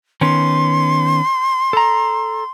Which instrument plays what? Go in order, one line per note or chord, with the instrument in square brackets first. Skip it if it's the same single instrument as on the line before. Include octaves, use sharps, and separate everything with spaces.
[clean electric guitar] D#3 B3 C#4 [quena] C6
[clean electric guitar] A4 A#5